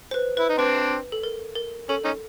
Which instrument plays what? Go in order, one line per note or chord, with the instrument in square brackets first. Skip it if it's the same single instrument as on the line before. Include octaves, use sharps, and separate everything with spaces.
[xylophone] C5
B4
[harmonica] E4 [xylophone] B4
[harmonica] D#4
[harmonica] C4 D4 [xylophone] B4
[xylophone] A4
A#4
A#4
[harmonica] C#4 [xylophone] A4
[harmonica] C#4 D#4